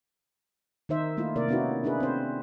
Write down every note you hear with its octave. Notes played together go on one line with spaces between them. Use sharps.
D#3 D#4 C5 E5
A3 A#3 E4 F4
C3 A#3 A#4 D5
B3 C#4 D#4 E4 F#4
D4 E4 G#4 B4
C4 C5